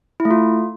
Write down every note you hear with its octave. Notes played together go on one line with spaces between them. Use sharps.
E4
A3
F4